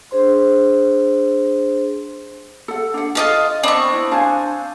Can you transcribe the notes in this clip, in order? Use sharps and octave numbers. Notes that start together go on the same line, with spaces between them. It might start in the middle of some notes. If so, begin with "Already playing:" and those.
D4 G#4 C5 C6
A4 F#5
D4 F#5
F4 A4 D#5 F5
B3 C4 D4 C#6
E4
D4 C5 F5 F#5 G#5 A5